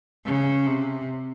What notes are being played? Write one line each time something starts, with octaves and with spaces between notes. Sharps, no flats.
C#3
C3